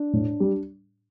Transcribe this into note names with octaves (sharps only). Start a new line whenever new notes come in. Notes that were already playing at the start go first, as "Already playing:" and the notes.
Already playing: D4
A2
G3